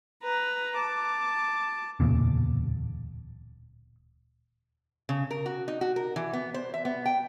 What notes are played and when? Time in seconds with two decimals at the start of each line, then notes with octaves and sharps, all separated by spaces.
0.23 B4 A#5
0.77 A5 D6
2.00 D1 E2 A#2 C#3
5.09 C#3
5.31 A#4
5.46 F#4
5.68 D#4
5.81 F#4
5.96 A#4
6.16 E3
6.33 B3
6.54 C5
6.74 E5
6.85 B3
7.06 G5